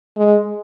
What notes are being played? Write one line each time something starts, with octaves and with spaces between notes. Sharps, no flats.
G#3